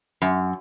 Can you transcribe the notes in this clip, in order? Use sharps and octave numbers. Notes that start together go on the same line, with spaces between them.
F#2